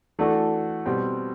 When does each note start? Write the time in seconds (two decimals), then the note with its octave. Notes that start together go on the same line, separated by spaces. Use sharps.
0.19 E3 A3 D4 F#4 A4
0.86 B2 G3 C4